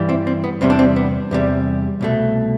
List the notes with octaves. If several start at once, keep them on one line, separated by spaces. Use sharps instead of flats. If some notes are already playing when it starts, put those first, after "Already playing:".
Already playing: G2 E3 G3
C4 E4
C4
B3
E2 C3 G3 C4
D4
C4
B3
E2 C3 G3
C2 B2 A3